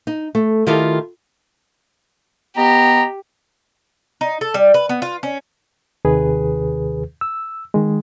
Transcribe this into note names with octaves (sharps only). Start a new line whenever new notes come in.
D#4
A3
D#3 E4 F4 G4 A4
B3 G4 D#5 A#5
D#4
A4
G3
B4
B3
F4
C#4
D#2 C3 D#3 G#4 B4
E6
D#3 G#3